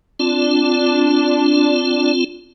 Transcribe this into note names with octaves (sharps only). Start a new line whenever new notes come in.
C4 D4 F4